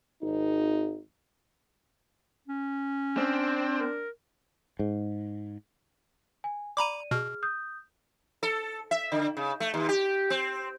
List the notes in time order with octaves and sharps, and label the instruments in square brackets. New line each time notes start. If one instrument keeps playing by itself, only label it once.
[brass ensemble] G#1 D#4
[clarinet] C#4
[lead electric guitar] C4 [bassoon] D4
[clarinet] A#4
[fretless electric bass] G#2
[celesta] G#5
[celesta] D5 D#7 [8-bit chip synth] A#5 B5 D6
[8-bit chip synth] B2 [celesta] G#4 F6
[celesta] D#6 G6
[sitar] A4
E5
D3
C#3
A3
D#2
G4
C4